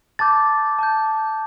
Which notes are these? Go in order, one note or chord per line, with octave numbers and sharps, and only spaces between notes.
A5 D6 G6 A6
A5 D6 G6